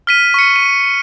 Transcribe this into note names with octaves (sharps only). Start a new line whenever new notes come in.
F6 B6 D#7
C#6 C#7
D#7